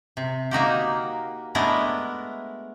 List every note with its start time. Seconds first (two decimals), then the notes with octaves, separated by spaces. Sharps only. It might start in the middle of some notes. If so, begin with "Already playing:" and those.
0.17 C3
0.51 A#3 D#4 F#4 G4
1.55 G#3 A3 B3 D4 E4 A#4